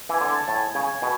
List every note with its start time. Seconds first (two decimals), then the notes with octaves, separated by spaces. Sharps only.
0.09 E3 G#5
0.21 D3
0.35 A5
0.48 A2
0.55 G#5
0.75 C#3 G#5
1.02 B2